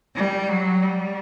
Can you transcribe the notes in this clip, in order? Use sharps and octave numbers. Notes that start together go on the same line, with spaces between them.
G3
F#3
G3